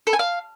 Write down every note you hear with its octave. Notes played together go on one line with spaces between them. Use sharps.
A4
G#5
F5